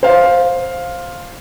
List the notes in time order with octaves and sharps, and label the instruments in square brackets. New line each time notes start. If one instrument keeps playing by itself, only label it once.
[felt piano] C5 F5